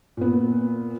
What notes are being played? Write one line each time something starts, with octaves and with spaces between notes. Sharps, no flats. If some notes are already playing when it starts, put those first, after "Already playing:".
A#2 B3